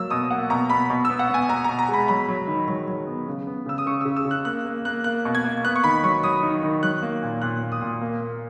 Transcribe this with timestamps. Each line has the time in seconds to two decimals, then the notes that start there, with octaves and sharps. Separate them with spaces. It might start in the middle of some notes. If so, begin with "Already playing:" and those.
Already playing: F#3 A#3 E6
0.10 B2 D#6
0.31 A#3 F#5
0.50 B2 A#5
0.70 B2 B5
0.90 B2
1.05 E6
1.10 B3
1.19 F#5
1.29 B3 G#5
1.49 B2 A#5
1.64 A#5
1.69 B2
1.79 A#5
1.88 G#3
1.93 B5
2.08 F#3 B5
2.29 F#3
2.47 D#3
2.68 F#3
2.88 F#3
3.07 B3
3.27 C#3
3.47 B3
3.66 C#3 E6
3.78 D#6
3.86 C#3 C#6
4.01 E6
4.05 C#3
4.16 E6
4.25 C#3
4.31 F#6
4.45 A#3 F#6
4.65 A#3
4.85 A#3 F#6
5.04 A#3 F#6
5.25 B2
5.35 G#6
5.44 A#3
5.64 B3 F#6
5.76 C#6
5.84 D#3 B5
6.03 F#3 C#6
6.23 F#3 D#6
6.43 D#3
6.63 D#3
6.83 F#3 F#6
7.02 A#3
7.23 A#2
7.42 A#2 F#6
7.62 A#3
7.72 D#6
7.81 A#2
8.01 A#3
8.20 A#3